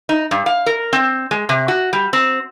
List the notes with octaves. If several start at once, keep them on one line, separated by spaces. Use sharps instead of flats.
D#4
G2
F5
A#4
C4
G#3
C3
F#4
G3
C4